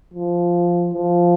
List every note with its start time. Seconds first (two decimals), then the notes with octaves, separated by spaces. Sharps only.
0.14 F3
0.94 F3